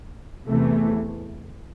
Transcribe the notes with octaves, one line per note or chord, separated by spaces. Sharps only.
E2 C3 E3 A3